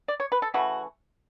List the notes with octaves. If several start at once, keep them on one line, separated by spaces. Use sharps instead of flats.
D5
C#5
B4
A4
C#3 E3 A3 F#4